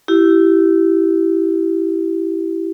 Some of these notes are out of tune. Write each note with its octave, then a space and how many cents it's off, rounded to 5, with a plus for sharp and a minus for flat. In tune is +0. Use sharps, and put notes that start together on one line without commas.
E4 +0 G4 -20